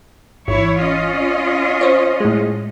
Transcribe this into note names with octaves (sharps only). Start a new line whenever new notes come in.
G#1 E3 E4 C#5
C#4 F4 D#5
C5 C#5
A2 G#3